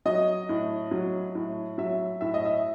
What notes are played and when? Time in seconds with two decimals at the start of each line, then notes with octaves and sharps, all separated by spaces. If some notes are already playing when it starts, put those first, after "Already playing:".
0.05 F#3 D#5
0.49 A2
0.91 F#3
1.35 A2
1.78 F#3 E5
2.21 A2 E5
2.34 D#5
2.45 E5